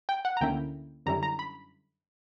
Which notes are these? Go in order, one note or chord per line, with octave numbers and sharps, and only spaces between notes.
G5
F#5
A#5
D2 D3 A#3 C#4 E4 G5
F#2 D3 G3 C#4 E4 A#5
A#5
B5